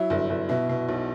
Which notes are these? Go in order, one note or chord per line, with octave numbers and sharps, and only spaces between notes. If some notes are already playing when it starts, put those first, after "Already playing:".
Already playing: F#3 E4
G1
G1
B2 E4
B2
B1